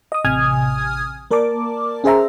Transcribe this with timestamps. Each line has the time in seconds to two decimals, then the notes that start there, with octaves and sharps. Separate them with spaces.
0.12 D#5 D#6
0.25 A1 C3 G#5 D#6 F6 G#6
1.31 A#3 A#4 D5 A5 D6
2.04 C#4 G#4 C5 E5 A#5